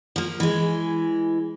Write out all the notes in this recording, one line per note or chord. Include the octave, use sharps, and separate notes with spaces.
F3 A#3
E3 G#3